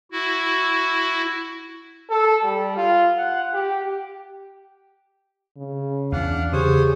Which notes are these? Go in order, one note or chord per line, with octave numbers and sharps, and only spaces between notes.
E4 F#4
A4
G3
F4
F#5
G4
C#3
E2 E3 D4 F5 F#5
C#3 G4 G#4 C5 C#5 D#6